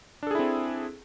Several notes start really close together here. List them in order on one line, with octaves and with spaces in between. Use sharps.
D4 A4 G#4 E4 C4